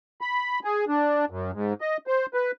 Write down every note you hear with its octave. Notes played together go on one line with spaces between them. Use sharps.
B5
G#4
D4
F#2
G#2
D#5
C5
B4